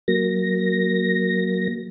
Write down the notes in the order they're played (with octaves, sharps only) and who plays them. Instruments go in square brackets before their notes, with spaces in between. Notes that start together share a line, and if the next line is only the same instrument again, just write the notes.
[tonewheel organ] F#3 A#3 A#6